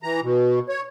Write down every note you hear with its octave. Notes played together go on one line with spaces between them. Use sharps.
E3 A#5
B2
C#5